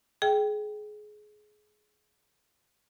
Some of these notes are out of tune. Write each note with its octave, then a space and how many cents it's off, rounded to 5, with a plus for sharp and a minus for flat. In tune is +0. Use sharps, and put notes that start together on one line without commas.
G#4 +25 G5 +0